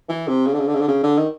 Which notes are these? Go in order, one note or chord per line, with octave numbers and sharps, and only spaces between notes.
E3
C3
C#3
D3
C#3
D3
C#3
D3
C#3
D3
D#3